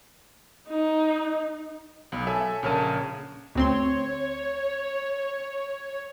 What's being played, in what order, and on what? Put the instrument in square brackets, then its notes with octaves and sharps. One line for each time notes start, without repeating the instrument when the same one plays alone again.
[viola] D#4
[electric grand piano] B1
A4 C#5 E5 G#5
A#1 C#3 A#4 C#5 A5 D#7
[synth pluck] D2 C4 C6 [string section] C#5